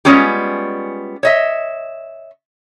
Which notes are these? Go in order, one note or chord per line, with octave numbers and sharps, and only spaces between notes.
G3 G#3 B3 C#4 F4 G4
C#5 D#5 E5